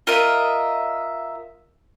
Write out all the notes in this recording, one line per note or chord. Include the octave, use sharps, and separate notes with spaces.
F4 A#4 D#5 E5